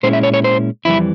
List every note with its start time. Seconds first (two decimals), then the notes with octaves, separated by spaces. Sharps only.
0.03 A#2 G#3 C#4 E4 C5
0.13 E5
0.23 C#5
0.34 C#5
0.44 C5
0.85 F2 E3 G3 E4